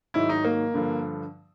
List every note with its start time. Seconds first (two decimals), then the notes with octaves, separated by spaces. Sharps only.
0.14 G#2 D#3 F#3 E4
0.29 D#4
0.44 A#3
0.74 G2 D3 F3